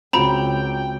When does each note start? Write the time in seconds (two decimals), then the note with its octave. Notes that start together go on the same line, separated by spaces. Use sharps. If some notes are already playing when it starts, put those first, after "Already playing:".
0.13 C#2 C4 F4 F#4 G5 A#5 B5